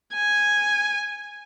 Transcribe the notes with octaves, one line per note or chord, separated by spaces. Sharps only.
G#5